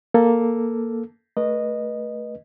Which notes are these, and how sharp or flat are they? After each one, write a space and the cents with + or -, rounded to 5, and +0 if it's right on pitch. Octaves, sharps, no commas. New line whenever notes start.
A#3 +0 A4 +0
A3 +0 B4 -30 D#5 -10